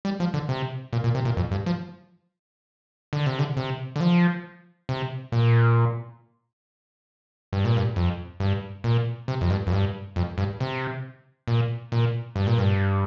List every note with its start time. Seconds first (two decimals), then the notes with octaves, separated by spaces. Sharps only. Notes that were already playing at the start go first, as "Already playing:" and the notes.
0.05 G3
0.20 F3
0.34 D3
0.49 C3
0.93 A#2
1.04 A#2
1.15 C3
1.25 A#2
1.37 F2
1.51 G2
1.66 F3
3.13 D3
3.26 C3
3.39 D3
3.57 C3
3.96 D3
4.01 F3
4.89 C3
5.32 A#2
7.53 G2
7.65 A#2
7.77 G2
7.96 F2
8.40 G2
8.84 A#2
9.28 C3
9.41 F2
9.50 G2
9.67 F2
9.72 G2
10.16 F2
10.38 G2
10.60 C3
11.48 A#2
11.92 A#2
12.36 G2
12.47 A#2
12.58 G2